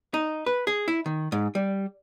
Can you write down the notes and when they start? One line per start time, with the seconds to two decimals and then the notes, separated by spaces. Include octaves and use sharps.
0.14 D#4
0.46 B4
0.67 G#4
0.88 E4
1.06 D#3
1.32 G#2
1.55 G3